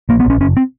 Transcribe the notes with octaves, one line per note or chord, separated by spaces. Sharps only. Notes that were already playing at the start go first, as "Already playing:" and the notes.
A#1 A#3
B3
A#1
C#4
F#1 C#4
C4